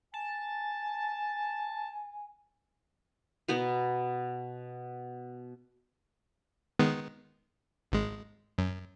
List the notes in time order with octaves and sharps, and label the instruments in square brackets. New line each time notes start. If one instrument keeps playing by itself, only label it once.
[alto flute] G#5 [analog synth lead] A5
[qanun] B2 B3 A#5
[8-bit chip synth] D#3 G#3 B3
G#1 G#3
F#2